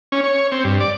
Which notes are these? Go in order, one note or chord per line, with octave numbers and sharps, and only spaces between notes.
C#4
C#5
C4
G2
D5